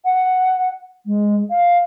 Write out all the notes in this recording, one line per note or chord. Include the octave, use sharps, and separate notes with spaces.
F#5
G#3
F5